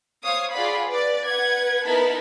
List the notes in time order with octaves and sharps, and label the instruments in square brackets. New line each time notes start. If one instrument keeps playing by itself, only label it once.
[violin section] C5 C#5 F5 D#6
F4 G#4 D5 F5 F#5 B5
B4 D5
B4 F#5 G#6
B3 D#4 E4 A#4 A5 B5